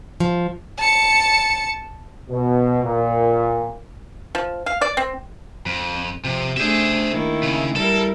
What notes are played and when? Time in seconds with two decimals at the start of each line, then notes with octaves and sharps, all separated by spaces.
0.20 F3
0.78 A5 C#7
2.30 B2
2.84 A#2
4.35 F3
4.66 F5
4.81 D5
4.97 C4
5.66 F2
6.25 C3 F3
6.57 A3 D4 G#4 C5 E5
7.11 D#3 A#3 E4
7.43 C#3
7.76 G3 E4 A4 A#4